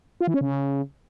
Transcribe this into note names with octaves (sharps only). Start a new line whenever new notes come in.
F4
E3
C#4
C#3